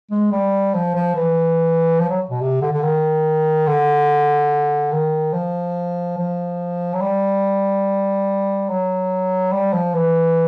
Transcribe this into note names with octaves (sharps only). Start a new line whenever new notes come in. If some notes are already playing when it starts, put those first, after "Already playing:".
G#3
G3
F3
F3
E3
F3
F#3
B2
C3
D3
D3
D#3
D3
D#3
F3
F3
F#3
G3
F#3
G3
F3
E3